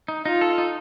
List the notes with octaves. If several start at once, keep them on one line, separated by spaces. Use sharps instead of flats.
D#4
D#4 F4
A4
D#4